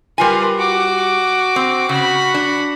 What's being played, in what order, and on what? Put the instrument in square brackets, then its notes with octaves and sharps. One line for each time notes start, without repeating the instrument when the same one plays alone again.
[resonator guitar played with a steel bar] G3 F4 G#5 [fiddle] A#4 B4
[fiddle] F#4 D6
[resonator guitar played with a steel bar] C4
[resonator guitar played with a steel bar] C#3 [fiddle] F#4 B5
[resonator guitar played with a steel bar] D4